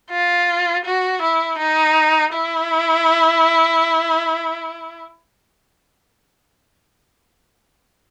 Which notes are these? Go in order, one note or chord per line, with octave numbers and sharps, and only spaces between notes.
F4
F#4
E4
D#4
E4